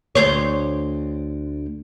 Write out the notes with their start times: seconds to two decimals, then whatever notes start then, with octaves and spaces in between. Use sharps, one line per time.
0.15 D2 C5 C#5